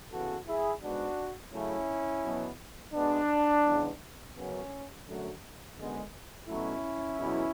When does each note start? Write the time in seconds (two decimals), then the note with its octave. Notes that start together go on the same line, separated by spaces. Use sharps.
0.11 C#3 E3 B3 F#4 A4
0.47 E4 G#4
0.82 G#2 G#3 B3 D4 F#4
1.52 C#3 F#3 A3 C#4 E4
2.24 B2 F#3 B3
2.94 B2 G#3 B3 D4
3.65 E2 C#3 G#3 B3
4.36 F#2 C#3 F#3 B3 C#4
5.06 F#2 D3 F#3 A3
5.77 F#2 D3 G#3 B3
6.47 B2 F#3 A3 C#4 E4
7.18 E2 B2 F#3